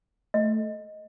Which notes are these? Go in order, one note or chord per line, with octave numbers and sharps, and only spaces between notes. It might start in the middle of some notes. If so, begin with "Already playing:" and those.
A3 D#5